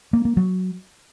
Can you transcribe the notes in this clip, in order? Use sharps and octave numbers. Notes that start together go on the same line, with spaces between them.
A#3
A#3
F#3